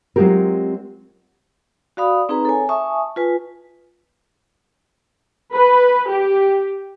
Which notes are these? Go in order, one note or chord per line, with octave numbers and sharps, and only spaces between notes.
F#3 G#3 C4 F4 G4 A#4
F#4 D5 F5 B5 D#6
C4 D#4 G#4 B4 A#5
A4 C#5 G#5
E5 G#5 A5 C#6 D#6
F4 B4 G#5
B4
G4